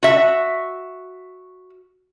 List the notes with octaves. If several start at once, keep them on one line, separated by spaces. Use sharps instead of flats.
F#4 E5